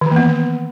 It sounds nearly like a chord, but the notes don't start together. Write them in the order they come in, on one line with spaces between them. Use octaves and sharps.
D#3 E3 A#3 B3